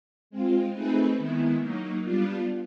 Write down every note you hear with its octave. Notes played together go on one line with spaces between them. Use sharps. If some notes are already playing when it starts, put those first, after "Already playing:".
G#3 C4 F4
A3 C4 D#4 G#4 B4
D#3 G#3 B3 E4
F#3 A#3 D#4
G3 B3 D4 F4